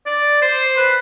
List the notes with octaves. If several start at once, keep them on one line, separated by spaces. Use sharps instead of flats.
D5
C5
B4